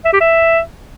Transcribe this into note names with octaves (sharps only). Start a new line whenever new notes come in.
E5
G4
E5